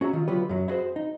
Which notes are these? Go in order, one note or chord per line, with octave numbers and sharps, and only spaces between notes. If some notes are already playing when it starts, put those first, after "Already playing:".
C#4 F#4 G#4 E5 A#5
D#3 F4
D3 F#3 B3 F4 G4 B4
F#2 F#3
E4 F#4 G#4 C5
D#4